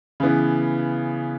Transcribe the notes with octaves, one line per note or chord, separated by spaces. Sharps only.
C#3 E3 B3